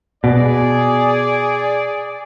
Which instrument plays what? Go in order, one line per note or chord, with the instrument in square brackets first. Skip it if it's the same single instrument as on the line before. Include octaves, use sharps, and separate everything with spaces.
[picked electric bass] B2 [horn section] G#4 D5